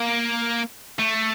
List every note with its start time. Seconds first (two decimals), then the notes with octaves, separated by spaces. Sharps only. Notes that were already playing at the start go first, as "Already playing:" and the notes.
Already playing: A#3
0.99 A3